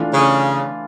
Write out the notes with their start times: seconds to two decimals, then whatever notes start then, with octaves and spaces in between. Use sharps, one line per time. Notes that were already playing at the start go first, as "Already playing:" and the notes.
Already playing: E3 A3 D4 F4
0.13 C#3